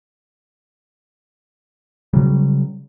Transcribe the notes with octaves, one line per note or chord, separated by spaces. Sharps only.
C#3 F#3 G3